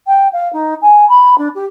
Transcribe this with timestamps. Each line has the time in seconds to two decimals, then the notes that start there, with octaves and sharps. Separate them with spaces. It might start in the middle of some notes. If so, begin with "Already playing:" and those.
0.07 G5
0.32 F5
0.52 D#4
0.81 G#5
1.08 B5
1.38 D4
1.55 G4